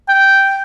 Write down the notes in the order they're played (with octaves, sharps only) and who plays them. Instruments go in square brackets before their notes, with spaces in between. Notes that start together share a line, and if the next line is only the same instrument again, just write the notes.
[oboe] G5